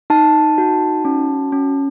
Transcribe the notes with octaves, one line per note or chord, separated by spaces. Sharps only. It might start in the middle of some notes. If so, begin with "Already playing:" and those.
D#4 A5
F#4
C#4
C#4